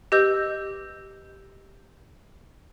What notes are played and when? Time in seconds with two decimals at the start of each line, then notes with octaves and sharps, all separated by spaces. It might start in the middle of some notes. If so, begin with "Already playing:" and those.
0.12 G4 B4 D#5 E6 G6